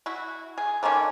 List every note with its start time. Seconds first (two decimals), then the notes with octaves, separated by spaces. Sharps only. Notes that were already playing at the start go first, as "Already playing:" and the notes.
0.06 E4 F#4
0.58 G#4
0.83 D3 D#3 A#3 C#4